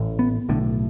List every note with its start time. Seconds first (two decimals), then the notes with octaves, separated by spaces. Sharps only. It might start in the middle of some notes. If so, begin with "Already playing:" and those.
Already playing: A1 A2
0.19 B3
0.49 B1 A2 D3